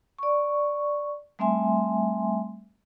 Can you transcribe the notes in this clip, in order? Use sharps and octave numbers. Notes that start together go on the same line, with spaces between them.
D5 C#6
G3 A3 C4 E5 G#5 C6